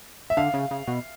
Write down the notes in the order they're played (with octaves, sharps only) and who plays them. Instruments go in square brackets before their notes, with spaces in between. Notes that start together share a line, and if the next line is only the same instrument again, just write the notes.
[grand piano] E5
[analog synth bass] D3 [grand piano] F5
[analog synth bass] C#3
C#3
B2